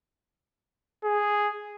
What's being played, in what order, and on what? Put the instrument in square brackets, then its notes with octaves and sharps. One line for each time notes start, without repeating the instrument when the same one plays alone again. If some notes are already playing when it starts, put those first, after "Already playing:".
[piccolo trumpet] G#4